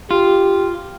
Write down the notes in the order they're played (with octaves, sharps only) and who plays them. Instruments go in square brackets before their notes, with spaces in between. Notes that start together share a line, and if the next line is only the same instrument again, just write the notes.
[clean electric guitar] F4 [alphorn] G4